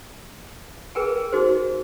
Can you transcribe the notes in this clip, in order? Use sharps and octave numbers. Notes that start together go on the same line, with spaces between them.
G#4 A#4 B4 G5 G#5
D#4 F#4 G#4 C5